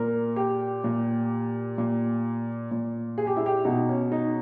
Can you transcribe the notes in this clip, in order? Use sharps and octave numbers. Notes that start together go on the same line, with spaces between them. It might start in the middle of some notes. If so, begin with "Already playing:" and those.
Already playing: A#2 A#4
G4
A#2
A#2
A#2
G#4
G4
E4
G4
B2 D#4
C#4
D#4